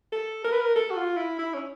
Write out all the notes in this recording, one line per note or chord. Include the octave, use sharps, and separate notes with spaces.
A4
A#4
B4
A#4
A4
F#4
F4
E4
E4
C#4